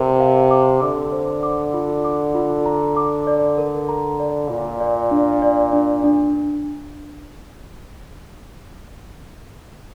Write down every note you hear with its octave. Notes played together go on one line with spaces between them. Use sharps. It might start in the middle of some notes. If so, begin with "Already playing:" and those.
Already playing: C3 A#4
F5
D6
D3 D6
C5
D6
F4
D6
F4
A#5
D6
D5
A#4
A#5
D5
A#2 F4
D5
D4
D5
D4
D4